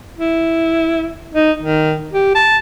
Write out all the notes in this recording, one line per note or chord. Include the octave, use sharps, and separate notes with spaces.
E4
D#4
D#3
G4
A5